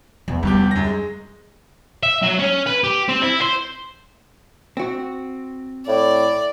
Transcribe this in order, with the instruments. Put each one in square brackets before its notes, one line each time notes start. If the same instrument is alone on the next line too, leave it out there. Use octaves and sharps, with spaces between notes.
[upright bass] E2
[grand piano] F1 E2 G4 [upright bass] G3
[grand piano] F#2 A#6
G#3
[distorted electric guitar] E5
F#3
C#4
B4
G4
C4
E4
C5
[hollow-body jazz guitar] C4 F#4
[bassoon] A2 [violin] D5